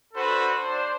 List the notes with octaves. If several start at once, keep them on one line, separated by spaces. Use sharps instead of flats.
D4 F#4 A4 B4 C5
D4 C5